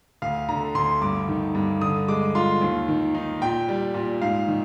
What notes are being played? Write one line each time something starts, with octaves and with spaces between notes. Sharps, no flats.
D2 F5
D3 A#5
D2 C6
G2 D6
D#3
G2
D3 D#6
G#3 D6
F4 C6
D#2
D#3
D#4
A#2 G5
G3
A#2
G#2 F5
D#3